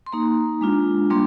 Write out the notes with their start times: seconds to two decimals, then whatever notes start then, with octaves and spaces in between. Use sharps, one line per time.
0.06 C6
0.12 A#3 D#4 A#5
0.61 G#3 D4 F4
1.10 G3 A#3 D4 C6